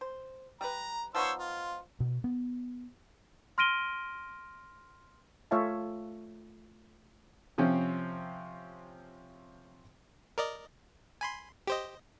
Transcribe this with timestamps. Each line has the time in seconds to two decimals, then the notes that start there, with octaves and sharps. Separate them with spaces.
0.01 C5
0.61 G3 B4 A#5
1.15 F3 B3 D#4 C5 C#5 E6
1.38 F4
2.00 B2
2.24 B3
3.58 C6 F6 A#6 D7 D#7 G7
5.51 A3 F4 C#5 E5 F5 A5
7.58 C3 F3 C4 C#4
10.38 A#4 D5 D#5
11.21 G#5 B5 C6
11.67 G4 C5 D#5